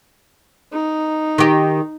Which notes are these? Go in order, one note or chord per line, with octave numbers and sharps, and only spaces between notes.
D#4
D#3 G4